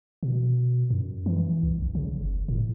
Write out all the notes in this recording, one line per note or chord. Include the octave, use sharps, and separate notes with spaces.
B2
F#2
E3
C2
A#1
C#3
F#1
A2